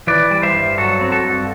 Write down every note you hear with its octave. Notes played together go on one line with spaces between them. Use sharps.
E3 B4 D5
G3
C5 E5
G2
F#3 F#4 A4
C4
F#4 A4
G2